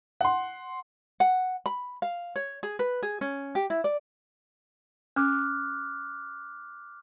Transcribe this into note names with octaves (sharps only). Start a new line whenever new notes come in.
F#5 C6
F#5
B5
F5
C#5
G#4
B4
G#4
C#4
G4
E4
D5
C#4 D6 F6 F#6